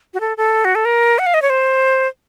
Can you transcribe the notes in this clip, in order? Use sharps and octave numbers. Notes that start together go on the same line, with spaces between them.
F#4
A4
A4
F#4
A4
A#4
F#5
F5
D#5
C#5
C5